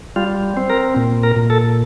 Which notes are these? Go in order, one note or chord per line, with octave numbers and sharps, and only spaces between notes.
G3 F4
C4
A#4
A#2
A#4
A#2
A4